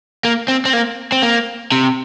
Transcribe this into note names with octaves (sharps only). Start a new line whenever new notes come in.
A#3
C4
C4
A#3
C4
A#3
C3